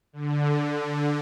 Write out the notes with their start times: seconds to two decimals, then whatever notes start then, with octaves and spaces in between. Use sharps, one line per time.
0.13 D3